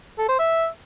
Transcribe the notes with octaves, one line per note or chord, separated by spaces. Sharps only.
A4
C5
E5